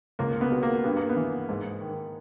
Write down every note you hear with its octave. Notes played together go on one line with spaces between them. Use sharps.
C#2 A#3
B3
B2
A#3
G2 B3
A#3
B3
E3
G#2
D#3